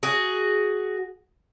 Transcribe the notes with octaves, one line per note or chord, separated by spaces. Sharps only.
F#4 G#4